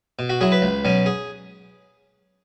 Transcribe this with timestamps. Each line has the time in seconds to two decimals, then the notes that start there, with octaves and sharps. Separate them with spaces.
0.19 B2
0.30 F#4
0.41 F#3 E4 G#4
0.52 B4
0.62 C#2
0.85 B2 F#3 C#4
1.06 G#4